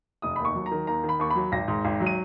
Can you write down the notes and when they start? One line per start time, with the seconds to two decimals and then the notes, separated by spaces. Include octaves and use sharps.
0.22 F1 D#6
0.36 D#2 B5
0.45 C#6
0.55 F#3
0.66 A#5
0.71 D#3
0.87 D#2 A#5
1.04 D#3
1.09 B5
1.19 D#2 C#6
1.30 F#3 B5
1.52 G#1 A#6
1.68 G#2
1.85 G#1
2.00 F#3
2.06 D#7